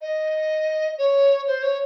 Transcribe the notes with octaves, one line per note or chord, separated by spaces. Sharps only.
D#5
C#5
C5
C#5